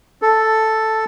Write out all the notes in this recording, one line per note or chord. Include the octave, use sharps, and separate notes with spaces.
A4